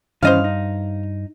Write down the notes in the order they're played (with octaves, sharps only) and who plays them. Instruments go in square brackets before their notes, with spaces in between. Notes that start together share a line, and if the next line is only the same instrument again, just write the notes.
[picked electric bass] G2 [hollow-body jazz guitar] D#3 E3 C#4 [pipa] C5 D#5 F5
[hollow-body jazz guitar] D#4